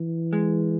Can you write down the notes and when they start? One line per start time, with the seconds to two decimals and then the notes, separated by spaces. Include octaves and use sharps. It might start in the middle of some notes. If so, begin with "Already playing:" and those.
Already playing: E3
0.33 G#3